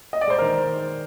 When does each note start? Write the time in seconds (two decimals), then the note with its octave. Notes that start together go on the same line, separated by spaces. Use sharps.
0.13 D#5
0.21 D5
0.27 G#3 C5
0.38 D#3 A#4